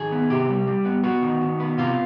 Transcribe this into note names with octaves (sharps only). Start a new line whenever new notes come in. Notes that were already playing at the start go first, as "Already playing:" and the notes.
Already playing: D#3 G#4
B3
C3 G4
G3
G3
B3
B3 F#4
D#3
D#3
B3
C3 F4